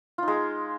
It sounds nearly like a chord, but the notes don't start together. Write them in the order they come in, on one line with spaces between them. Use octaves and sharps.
F4 D#4 G#3